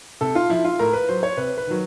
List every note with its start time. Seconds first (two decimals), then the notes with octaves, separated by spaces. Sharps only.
0.21 C3 A4
0.35 F4
0.50 F3 E4
0.64 F4
0.79 A2 A#4
0.93 B4
1.08 F#3 C5
1.23 C#5
1.37 C3 B4
1.57 B4
1.67 D#3 F#3